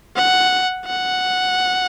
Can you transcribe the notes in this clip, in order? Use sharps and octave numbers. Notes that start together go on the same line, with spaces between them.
F#5
F#5